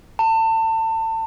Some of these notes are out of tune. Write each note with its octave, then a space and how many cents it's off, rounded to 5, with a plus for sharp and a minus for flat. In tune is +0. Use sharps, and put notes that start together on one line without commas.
A5 +30